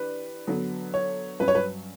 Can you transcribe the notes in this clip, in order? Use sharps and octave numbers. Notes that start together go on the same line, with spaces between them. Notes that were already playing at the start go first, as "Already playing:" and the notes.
Already playing: E3 D4 G4 B4
D3 F#3 B3
C#5
G2 F#3 C#4 B4
C#5
B4